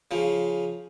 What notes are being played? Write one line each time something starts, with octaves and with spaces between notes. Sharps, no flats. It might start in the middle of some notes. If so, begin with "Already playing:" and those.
C#3 F3